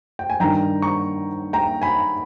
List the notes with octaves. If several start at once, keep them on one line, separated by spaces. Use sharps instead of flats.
G5
G#5
G2 D#3 G5 A#5
A#5 C#6
G5 A#5
G#5 B5